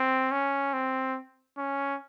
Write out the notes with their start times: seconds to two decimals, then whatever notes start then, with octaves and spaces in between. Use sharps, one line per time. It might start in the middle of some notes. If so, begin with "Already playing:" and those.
Already playing: C4
0.32 C#4
0.74 C4
1.58 C#4